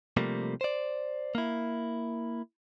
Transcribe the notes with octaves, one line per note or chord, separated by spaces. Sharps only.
C3 F3 G3 A3 A#3
C5 D5
A#3 E4